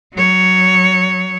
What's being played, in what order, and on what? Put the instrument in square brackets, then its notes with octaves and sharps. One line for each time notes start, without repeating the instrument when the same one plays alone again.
[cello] F#3 C#5